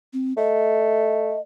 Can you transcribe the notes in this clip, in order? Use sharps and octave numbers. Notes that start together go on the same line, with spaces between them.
C4
A3 D#5